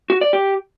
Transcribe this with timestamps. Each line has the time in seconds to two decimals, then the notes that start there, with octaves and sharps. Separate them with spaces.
0.10 F#4
0.21 D5
0.33 G4